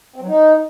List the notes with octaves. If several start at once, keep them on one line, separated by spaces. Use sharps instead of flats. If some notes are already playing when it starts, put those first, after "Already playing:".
C4
F#3
D#4